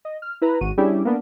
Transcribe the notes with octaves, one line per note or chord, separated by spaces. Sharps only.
D#5
F6
E4 B4 A#5
G#1 F#4 D#7
G3 C#4 D4 E4 G4 G#4
A#3 B3 D4